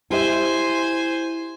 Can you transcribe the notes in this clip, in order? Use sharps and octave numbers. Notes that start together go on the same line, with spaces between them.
E4 G4 C5 E5 G#5